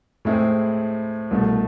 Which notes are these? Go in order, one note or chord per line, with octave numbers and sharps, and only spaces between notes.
A2 G#3 C4 E4 G#4
C2 B2 A3